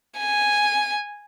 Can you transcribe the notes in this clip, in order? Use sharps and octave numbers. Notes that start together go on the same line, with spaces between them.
G#5